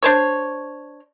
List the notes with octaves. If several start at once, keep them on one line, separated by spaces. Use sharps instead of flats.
D4 C5 C#5